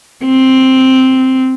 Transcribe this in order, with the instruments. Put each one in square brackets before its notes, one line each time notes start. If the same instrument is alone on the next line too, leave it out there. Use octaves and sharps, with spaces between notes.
[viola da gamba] C4